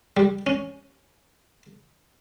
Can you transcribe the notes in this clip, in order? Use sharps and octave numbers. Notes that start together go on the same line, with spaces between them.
G3
C#4